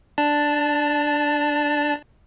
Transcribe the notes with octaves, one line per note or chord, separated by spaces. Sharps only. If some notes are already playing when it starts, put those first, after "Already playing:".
D4 A5